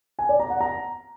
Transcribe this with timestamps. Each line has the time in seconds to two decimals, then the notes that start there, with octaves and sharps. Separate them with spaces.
0.19 G#5
0.29 D5
0.40 A#5
0.50 F#5
0.60 A#5